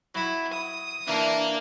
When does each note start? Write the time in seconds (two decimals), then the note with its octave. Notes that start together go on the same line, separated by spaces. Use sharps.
0.15 F#3 E4 B5
0.53 D#6
1.08 E3 A#3 D4 F5